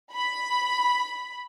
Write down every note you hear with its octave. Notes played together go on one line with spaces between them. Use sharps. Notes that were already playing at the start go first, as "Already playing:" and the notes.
B5